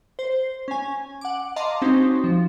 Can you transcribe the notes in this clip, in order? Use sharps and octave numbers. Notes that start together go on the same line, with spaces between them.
C5
C#4 G#5
F#5 D6
D#5 F5 A5 A#5 C6 D6
C4 C#4 D#4 F#4 C5
F3